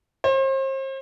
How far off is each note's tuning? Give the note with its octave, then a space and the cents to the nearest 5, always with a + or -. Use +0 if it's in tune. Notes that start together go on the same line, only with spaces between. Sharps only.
C5 +40